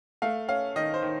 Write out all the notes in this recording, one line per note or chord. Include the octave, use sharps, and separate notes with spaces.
A3 F5
C#4 F5
D#3 D#5
C5
D#3